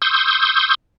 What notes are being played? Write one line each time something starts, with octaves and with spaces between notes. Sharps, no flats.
C6 C#6 D#6 E6 G6